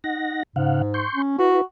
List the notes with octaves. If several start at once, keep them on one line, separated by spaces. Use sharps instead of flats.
D#4 F#5 A#6
G#2 C#3 F5 F#5
C6 C#6 G6
C#4
E4 F#4 B4